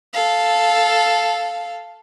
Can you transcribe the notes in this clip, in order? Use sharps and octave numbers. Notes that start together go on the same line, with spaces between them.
A4 F5